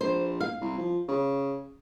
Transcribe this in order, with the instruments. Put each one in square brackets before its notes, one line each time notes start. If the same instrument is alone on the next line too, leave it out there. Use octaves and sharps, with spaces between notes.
[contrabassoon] A#1 [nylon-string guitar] C5
[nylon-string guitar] F5
[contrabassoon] C2
F3
C#3